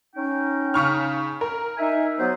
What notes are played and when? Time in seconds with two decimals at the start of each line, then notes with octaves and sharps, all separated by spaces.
0.16 C#4 D#4 G5
0.74 C#3 C#6 F6
1.41 A#4
1.78 D#4 E5 G#5
2.18 F#3 B3 C5